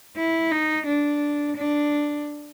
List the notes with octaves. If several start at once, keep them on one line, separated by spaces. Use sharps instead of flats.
E4
D#4
D4
D4